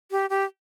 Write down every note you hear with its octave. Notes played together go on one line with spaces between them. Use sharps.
G4
G4